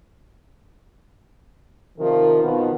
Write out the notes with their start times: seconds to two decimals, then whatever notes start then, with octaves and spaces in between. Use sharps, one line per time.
1.98 C3 D#3 F3 A#4
2.43 B2 D#3 F3 B3